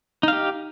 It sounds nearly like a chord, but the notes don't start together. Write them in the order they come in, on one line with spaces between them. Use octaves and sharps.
D#4 F5 G4